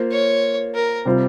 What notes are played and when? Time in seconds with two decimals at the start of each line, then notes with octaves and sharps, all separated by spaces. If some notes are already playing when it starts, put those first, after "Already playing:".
Already playing: A#3 F4 C5
0.12 C#5
0.74 A#4
1.05 C3 G3 C4 F4